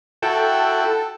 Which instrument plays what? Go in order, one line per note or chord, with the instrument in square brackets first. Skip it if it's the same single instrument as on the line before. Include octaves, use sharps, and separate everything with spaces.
[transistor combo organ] E4 F#4 [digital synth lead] A4 [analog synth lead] G5